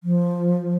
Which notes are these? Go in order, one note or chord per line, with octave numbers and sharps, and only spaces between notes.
F3